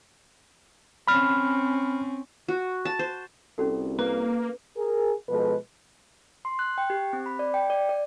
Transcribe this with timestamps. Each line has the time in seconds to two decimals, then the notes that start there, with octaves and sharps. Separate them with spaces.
1.08 C4 C#4 B5 F6
2.48 F#4
2.85 A5
2.99 C5
3.58 C2 C#4 F#4 A4
3.99 A#3 B4
4.77 G#4 A#4
5.28 B2 F3 G#3 A4 B4
6.45 C6
6.59 F#6
6.78 G5
6.90 G4
7.13 C4
7.26 B5
7.39 D5
7.54 G5
7.70 D5
7.89 D5